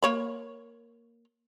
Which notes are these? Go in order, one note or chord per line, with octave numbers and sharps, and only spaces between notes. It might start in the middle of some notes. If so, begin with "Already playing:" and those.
A#3 C#5 B5